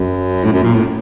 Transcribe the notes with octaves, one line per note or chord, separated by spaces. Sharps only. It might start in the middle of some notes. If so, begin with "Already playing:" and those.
Already playing: F#2
A2
F#2
A#2
A2